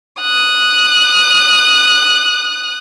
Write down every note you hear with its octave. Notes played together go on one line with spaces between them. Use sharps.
D#6 F#6